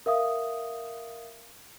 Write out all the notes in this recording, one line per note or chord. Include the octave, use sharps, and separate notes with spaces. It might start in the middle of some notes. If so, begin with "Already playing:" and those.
A#4 E5 F5 D#6